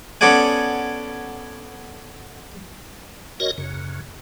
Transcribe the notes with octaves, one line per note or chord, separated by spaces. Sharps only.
B3 C#4 A4 D5 F#5 G#5
F#4 A#4 C#5 D#5
F#2 C#3